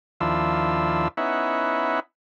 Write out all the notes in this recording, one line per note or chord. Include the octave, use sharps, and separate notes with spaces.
D#2 F3 D4 E4 F4 E6
B3 C#4 D#4 E4 E5 F#5